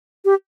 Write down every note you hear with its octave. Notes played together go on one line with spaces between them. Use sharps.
G4